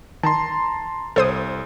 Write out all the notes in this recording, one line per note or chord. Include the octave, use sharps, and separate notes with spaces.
D#3 A5 A#5 C6
C2 A4 C5 D#6